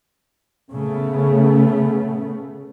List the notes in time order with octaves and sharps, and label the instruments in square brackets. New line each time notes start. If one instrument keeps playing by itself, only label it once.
[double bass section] C#3 A3 B3